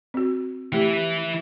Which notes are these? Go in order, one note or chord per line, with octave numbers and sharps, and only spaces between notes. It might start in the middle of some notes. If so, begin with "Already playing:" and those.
C4 F#4
E3 A3 E4 G4